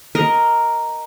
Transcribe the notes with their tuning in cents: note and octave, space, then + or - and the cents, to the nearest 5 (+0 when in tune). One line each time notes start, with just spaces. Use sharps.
A#4 +0 D#5 +0